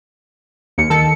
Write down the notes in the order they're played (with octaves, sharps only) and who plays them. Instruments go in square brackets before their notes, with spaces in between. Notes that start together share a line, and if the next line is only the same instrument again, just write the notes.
[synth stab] D#2 [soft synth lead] C#7
[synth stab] D#3 A4